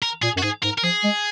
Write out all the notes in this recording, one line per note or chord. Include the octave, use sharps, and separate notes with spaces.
A#4
A#2 G#4
F#2 F#4
G#2 G#4
G#2 A#4
A#4
F3 G#4
G#3